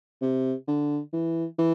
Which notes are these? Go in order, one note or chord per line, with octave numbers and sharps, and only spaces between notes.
C3
D3
E3
E3